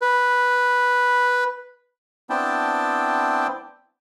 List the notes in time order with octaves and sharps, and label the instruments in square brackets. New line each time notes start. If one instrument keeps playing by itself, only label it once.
[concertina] B4
B3 C4 D4 E4 G5 A5